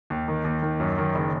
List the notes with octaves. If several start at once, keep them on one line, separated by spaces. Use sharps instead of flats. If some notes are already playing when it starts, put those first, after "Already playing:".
D#2
D#3
D#2
D#3
F#2
D#3
F#1